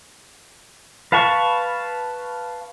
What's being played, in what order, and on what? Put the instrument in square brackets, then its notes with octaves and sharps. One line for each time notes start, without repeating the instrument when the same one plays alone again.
[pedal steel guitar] B4 F5 A5 B5 C#6